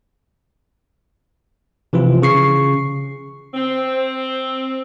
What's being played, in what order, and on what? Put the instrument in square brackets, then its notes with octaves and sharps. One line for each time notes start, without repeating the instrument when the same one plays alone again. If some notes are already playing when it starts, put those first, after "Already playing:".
[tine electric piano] C3 E3 F3 F4
C#3 C#6 C7
[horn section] C4